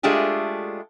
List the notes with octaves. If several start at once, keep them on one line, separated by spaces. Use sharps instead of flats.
G#3 A3 D4 F4 G4 G#4